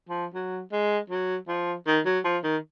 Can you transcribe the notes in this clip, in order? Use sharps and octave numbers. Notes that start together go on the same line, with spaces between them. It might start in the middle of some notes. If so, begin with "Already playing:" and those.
F3
F#3
G#3
F#3
F3
D#3
F#3
F3
D#3